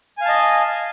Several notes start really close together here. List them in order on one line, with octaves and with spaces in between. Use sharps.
G#5 F5 A5 D#5